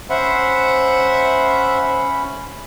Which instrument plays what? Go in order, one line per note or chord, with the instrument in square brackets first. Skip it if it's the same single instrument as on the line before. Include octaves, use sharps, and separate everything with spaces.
[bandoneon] C#4 B5 [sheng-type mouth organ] C5 E5 F#5